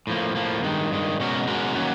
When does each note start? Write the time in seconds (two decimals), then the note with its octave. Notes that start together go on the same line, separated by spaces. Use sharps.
0.07 A2 F3 A#3
0.36 A2 F3 A#3
0.63 G2 D#3 G#3
0.91 G2 D#3 G#3
1.20 B2 G#3 C#4 F#4 A#4
1.48 B2 G#3 C#4 F#4 A#4
1.75 D#3 F#3 A#3 C#4 F#4